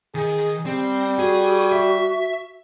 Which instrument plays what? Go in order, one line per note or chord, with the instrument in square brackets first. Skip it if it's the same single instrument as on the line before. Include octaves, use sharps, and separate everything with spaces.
[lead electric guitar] D#3 [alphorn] G#4
[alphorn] G3 [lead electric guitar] C4
[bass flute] F#4 [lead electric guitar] G#4
[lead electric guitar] E5